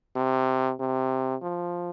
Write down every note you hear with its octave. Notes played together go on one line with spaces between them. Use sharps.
C3
C3
F3